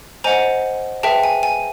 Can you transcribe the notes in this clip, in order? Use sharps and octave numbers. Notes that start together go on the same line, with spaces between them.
C5 D#5 F#5 G#5 A#5
G#4 B4 E5 G5 A5
G#5
G#5